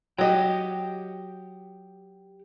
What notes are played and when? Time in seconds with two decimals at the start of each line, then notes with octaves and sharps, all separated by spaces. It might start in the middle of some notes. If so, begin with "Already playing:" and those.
0.18 F#3 G4 D#5 F#5 G5